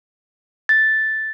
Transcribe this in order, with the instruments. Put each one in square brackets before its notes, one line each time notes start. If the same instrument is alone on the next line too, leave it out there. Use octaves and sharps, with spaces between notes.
[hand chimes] A6